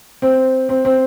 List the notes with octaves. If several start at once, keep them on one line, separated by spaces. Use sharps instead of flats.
C4
C4
C4